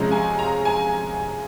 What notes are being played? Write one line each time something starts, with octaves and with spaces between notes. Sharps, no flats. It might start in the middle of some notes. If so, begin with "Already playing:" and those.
Already playing: C3 F3 G#3 C#4 A#5
G#5
A#5
G#5